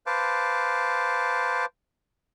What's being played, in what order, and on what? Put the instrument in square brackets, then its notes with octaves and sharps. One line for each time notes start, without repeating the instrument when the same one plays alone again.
[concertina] B4 C5 F5 A5 D6